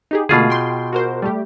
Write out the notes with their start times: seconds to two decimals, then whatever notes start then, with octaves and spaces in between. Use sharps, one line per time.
0.11 D#4 G4 G#4
0.29 B2 D3 A3 A#3 F4 G#4
0.50 G5 C6
0.93 F#4 A#4 C5
1.22 G3 A3 G4